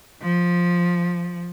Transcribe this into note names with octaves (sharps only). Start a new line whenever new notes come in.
F3